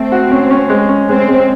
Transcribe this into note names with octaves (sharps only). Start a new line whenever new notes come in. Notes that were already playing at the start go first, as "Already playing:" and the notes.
Already playing: A3 C4
F#4
C#4
C#4
G#3
C#4
G#3 C4
G#3